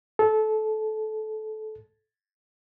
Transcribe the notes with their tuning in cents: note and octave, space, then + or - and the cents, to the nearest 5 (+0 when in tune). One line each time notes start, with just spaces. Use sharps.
A4 -20